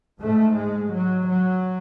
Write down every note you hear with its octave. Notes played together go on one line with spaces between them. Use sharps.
G#2 A3
G#3
F#3
F#3